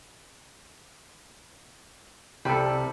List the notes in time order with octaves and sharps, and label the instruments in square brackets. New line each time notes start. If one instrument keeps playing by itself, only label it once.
[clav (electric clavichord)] C2 A4 [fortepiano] G3